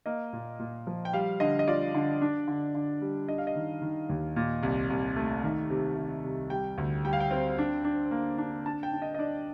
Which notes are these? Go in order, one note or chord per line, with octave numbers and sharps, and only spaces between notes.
A#3 D#5
A#2
A#2
F3
G5
G3 F5
D3 D#5
D#5
F4 D5
D3
D4
D3
D3
G3
D4 D#5
F5
D#5
D#3
D#3
D#2
A#2
C2
C2
A3
D#3
C3
C3
C2
G3 G5
D2
G3 G5
F5
G5
C4
D4
D4
A#3
D4
D4 A5
G5
D4
D#5
D#5
D4 D5